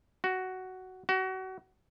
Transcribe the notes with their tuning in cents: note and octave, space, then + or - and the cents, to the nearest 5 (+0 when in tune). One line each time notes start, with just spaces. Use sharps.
F#4 +10
F#4 +30